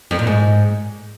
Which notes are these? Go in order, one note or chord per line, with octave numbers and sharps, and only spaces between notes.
F2
A#2
G#2